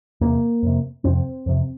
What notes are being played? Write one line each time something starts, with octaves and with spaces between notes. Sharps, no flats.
E2 C3 A#3
F2 C3
F2 C3 C4
F2 C3